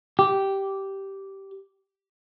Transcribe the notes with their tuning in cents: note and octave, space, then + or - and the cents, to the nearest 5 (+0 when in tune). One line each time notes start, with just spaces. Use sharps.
G4 -10